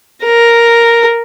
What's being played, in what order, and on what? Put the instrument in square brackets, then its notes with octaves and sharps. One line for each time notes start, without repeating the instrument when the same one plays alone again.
[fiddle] A#4